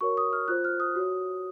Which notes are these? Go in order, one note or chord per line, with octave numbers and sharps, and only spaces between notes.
F#4 A#4 C#5 C#6
D#6
F6
F4 C5 F#6
F6
D#6
F#4 C#5